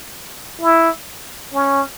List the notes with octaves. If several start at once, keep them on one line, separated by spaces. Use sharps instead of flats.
E4
C#4